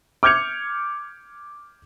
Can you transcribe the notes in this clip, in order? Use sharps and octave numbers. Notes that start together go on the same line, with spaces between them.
D6 F6 G6 G#6 C#7 F7